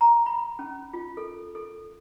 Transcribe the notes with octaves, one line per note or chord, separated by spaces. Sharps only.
A#5
B5
C#4
F4
A4
A4